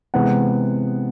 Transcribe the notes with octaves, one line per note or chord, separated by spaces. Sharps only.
C3 E3 G#3 B3 F#5